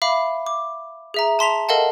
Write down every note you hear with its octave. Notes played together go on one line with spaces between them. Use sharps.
E5 F5 B5 D6
D6
G#4 E5 A#5
A5 C6 B6 F7
A4 A#4 D#5 F5 F#5 A5